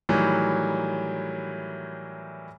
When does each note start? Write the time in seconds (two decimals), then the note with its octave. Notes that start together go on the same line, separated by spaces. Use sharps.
0.09 A2 D#3 E3 F#3 G3